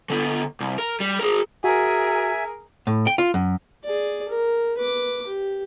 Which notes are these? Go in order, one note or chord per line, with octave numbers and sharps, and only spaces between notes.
D3 B3
C2
A#4
G3
G#4 A#4
F#4 G#4 A#4 E5 G#5
A2
G5
F4
F#2
G#4 D5
A#4
B4 D6
G4